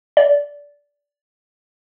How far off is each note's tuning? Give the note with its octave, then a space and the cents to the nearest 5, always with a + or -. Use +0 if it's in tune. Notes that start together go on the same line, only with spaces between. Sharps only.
D5 -15